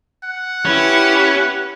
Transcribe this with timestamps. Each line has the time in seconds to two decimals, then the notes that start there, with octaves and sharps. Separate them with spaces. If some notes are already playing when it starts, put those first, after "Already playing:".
0.24 F#5
0.66 C#4 E4 G4 B4